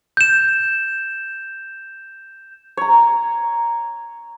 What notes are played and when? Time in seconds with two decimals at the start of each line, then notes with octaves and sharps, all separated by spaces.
0.17 G6 E7
2.77 C#5 A#5